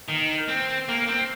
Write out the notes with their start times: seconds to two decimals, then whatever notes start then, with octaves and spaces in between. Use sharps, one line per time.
0.08 D#3
0.48 C4
0.89 A#3
1.07 C4